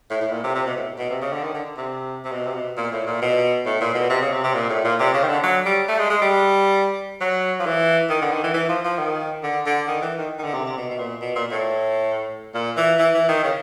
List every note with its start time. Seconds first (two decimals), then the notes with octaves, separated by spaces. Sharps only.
0.10 A2
0.21 A2
0.32 A#2
0.44 C3
0.55 C3
0.66 B2
0.76 A2
0.99 B2
1.10 C3
1.22 C#3
1.33 D3
1.43 D#3
1.55 D3
1.77 C3
2.25 C3
2.32 B2
2.47 C3
2.54 B2
2.77 A#2
2.92 A2
3.07 A#2
3.22 B2
3.66 A2
3.81 A#2
3.95 B2
4.10 C3
4.21 C#3
4.32 C3
4.44 C3
4.54 A#2
4.70 A2
4.85 A#2
5.00 C3
5.14 C#3
5.24 D#3
5.28 D3
5.44 F#3
5.66 G3
5.88 A3
5.99 G#3
6.10 G#3
6.22 G3
7.21 F#3
7.60 F3
7.66 E3
8.10 D#3
8.21 D3
8.32 D#3
8.44 E3
8.54 E3
8.69 F3
8.85 F3
8.98 D#3
9.43 D3
9.66 D3
9.87 D#3
10.02 E3
10.18 D#3
10.39 D#3
10.44 D3
10.54 C3
10.66 C3
10.77 B2
10.90 B2
10.99 A#2
11.21 B2
11.35 A#2
11.51 A2
12.54 A#2
12.77 E3
12.99 E3
13.14 E3
13.29 D#3
13.43 C#3